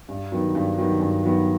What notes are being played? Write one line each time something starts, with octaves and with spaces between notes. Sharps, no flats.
G2
D#3 F#3 B3
G2
D#3 F#3 B3
G2
D#3 F#3 B3